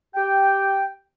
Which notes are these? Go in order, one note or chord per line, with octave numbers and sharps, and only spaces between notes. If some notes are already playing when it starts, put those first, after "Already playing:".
G4 G5